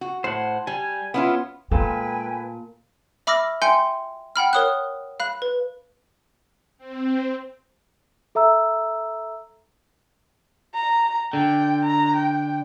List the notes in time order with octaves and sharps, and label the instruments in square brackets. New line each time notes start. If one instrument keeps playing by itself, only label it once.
[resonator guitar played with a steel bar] F#4
[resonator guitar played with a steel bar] A2 [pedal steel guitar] C5 F#5
[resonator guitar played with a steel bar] G3 [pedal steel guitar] G#5
[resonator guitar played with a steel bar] B3 C#4 F4 [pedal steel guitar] E4
[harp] A#2 F4 A4 [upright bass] G#3 [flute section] B4 G5 G#5
[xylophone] E5 B5 D6 E6 F6 A#6
E5 G5 G#5 C6 G6 C#7
F#5 G5 B5 F6
A#4 C#5 D#6 F6 F#6
F5 B5 F#6
B4
[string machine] C4
[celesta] A4 E5 A#5 E6
[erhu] A#5
[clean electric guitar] D3 [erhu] G5
[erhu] A#5
G5